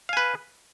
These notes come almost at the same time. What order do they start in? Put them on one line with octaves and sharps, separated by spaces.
F5 G#5 B4